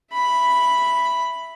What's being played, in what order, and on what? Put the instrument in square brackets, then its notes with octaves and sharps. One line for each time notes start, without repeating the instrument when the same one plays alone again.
[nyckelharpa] E5 B5